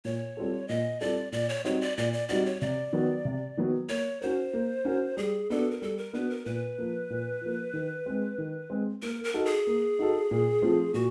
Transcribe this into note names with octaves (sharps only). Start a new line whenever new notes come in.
A#2 C#5
G3 C4 F4 A4
A#2 D#5
G3 C4 F4 A4 D5
A#2 D5
C#5
G3 C4 D#4 F#4 C#5
D5
A#2 D5
D5
G3 C4 D#4 F#4 D5
C#5
C3 D5
D#3 F#3 B3
C3
D#3 F#3 B3
A#3 C#5
C#4 F#4 A#4 C5
A#3
C#4 F#4 A#4
G3 G#4
B3 D4 F#4 A4
A#4
G3 A4
A#4
B3 D4 F#4 B4
A#4
A#2 B4
F3 A#3
A#2
F3 A#3
D#3
G#3 C4
D#3
G#3 C4
A#3 A#4
A#4
D#4 F#4 A4
G#4
A#3
D#4 F#4 A4
A#2
F3 A3 C4 F4
A#2 F#4